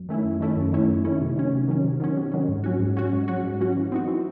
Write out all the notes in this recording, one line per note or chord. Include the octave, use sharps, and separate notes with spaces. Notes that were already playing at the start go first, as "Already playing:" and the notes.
Already playing: F#2
D#3 A3 C#4 E4
F#2
D#3 A3 C#4 E4
F#2
D#3 A3 C#4 E4
F#2
D#3 A3 C#4 E4
C3
D#3 F#3 C#4
C3
D#3 F#3 C#4
C3
D#3 F#3 C#4
C3
D#3 F#3 C#4
G#2
F#3 C#4 F#4
G#2
F#3 C#4 F#4
G#2
F#3 C#4 F#4
G#2
F#3 C#4 F#4
E3
C4 D#4 F#4
E3